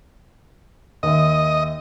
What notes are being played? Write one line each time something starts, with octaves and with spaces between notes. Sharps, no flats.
D#2 D#5 E5